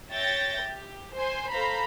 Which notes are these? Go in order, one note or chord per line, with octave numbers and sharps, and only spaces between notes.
C#5 E5 G5 G6 A6 A#6
G4
C5 G#5 C6
A4 C5 F5 A#5 B5